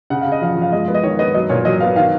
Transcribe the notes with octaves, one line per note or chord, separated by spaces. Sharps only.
C#3 F#5
C#3 F5
D#5
F3 F5
F3
F5
G#3 D#5
B3
D#5
D#3 C#5
B3 D#5
F#3 D#5
A#2 C#5
F#3 D#5
B3 F5
D#3 F5